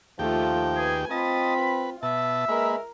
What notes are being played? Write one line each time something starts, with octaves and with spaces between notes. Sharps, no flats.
D#2 F3 A3 F4 G4 G5
G#4 B4 G#5
C4 F4 D#5 A5 B5
B4
B2 E5 A5
G#3 A#3 A#4 B4